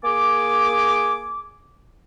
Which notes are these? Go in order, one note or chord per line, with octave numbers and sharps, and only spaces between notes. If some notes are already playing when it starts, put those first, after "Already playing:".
A#3 G#4 G#5 D6